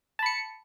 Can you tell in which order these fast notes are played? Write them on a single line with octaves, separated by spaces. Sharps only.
A5 B5 C#7